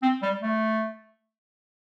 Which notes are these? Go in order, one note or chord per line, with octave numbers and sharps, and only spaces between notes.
C4
G3
A3